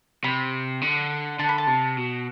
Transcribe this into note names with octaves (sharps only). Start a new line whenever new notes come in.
C3 B5
D3
D3 A5
B5
A5
C3
B2